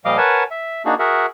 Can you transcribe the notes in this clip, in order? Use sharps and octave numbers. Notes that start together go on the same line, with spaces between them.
A#2 F3 G3 D#5 F5 D6
A#4 B4 C#5 F#5 G#5 A5
E5
A#3 D4 D#4 F#4 G#4
F#4 G#4 A#4 E5 F#5